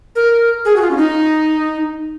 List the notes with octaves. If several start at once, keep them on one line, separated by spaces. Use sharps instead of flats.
A#4
G#4
F#4
F4
C#4
D#4